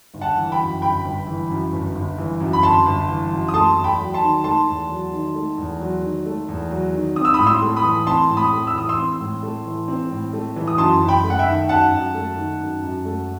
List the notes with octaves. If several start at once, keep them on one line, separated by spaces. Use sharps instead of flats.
G1
F#5 A5
E3
G5 B5
F#2
G1 G5 B5
G1
E3
F#2
G1
G1
E3
F#2
B5
G1 A5 C6
G1
E3
F#2
D#6
A3 A5 C6
E2
G5 B5
F#3
A5 C6
D#3
A3 A5 C6
E2
F#3
D#3
A3
E2
F#3
D#3
A3
E2
F#3
D#3
C4 D#6
E6
A2 B5 D#6
C6 E6
A3
B5 D#6
E3
C4 A5 C6
A2
B5 D#6
A3
E6
E3 D#6
C6 E6
C4
A2
A3
E3
C4
A2
A3
E3
D#6
F#2 A5 C6
F#2
G5 B5
A3
F#5
E5 G5
D#3
F#2 F#5 A5
F#2
A3
D#3
F#2
F#2
A3